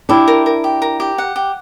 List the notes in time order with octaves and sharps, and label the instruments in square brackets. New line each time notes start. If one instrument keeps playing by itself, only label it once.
[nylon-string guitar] D4 E4 [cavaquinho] G4
[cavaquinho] A#4
A#4
G4
A#4
G4
F#5
G4